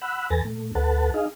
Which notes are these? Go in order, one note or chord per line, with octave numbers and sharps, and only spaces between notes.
F#5 B5 E6 F#6
E2 A4 B4 G#5 A6 A#6
A#2 A3
D2 A4 B4 F#5 A5
D#4 G#4 D#5 F5